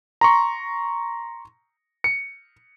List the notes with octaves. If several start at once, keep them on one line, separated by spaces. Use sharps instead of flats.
A#5 C6 C#6
C#7